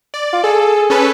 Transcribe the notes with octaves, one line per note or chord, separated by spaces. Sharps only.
D5
F4
G#4 A4
C#4 A4 B4